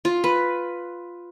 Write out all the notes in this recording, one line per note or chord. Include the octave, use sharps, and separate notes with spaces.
F4
B4